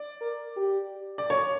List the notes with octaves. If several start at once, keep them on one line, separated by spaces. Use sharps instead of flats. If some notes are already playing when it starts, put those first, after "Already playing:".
Already playing: D5
A#4
G4
D5
C#5